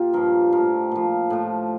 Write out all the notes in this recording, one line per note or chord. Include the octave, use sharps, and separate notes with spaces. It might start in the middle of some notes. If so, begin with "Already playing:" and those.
Already playing: A#2 F4 G4
G2 F3 A#4
A2 F3 A#4
A#2 F3
A2 F3